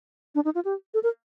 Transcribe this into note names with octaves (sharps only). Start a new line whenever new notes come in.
D4
D#4
F4
G4
A4
A#4